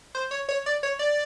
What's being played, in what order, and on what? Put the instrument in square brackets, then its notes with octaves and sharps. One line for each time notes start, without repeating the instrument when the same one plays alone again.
[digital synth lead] C5
C#5
C#5
D5
C#5
D5